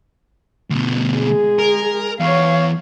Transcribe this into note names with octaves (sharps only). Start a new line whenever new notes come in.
D2 B2
G#3 G#4
A#4
E2 C#5 F5